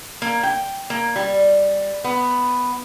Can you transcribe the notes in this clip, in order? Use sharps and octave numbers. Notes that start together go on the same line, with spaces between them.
A#3
G5
A#3
G3
B3